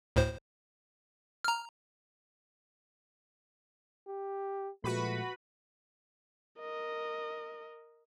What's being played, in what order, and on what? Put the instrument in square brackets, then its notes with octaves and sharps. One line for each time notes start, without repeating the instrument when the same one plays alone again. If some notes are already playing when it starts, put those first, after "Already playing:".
[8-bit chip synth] D2 A2 C5
A#5 F6
[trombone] G4
[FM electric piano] A#2 F3 G#3 [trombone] A3 [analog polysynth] F#4 B4 B5
[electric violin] A#4 D#5